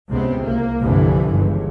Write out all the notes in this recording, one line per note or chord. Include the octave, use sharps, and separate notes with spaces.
C#2 C3 B3 C4
C2 A#3
C2 G2 D3 E3 F3
G1 C#2 G2